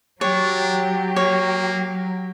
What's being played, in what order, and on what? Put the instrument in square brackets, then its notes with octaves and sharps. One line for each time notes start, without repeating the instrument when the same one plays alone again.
[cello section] F#3 [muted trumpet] D4 [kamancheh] G4 [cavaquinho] C#5
[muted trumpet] A#3 [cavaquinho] C#5